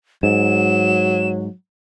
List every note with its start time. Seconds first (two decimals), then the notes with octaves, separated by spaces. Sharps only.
0.23 G#2 F#3 E7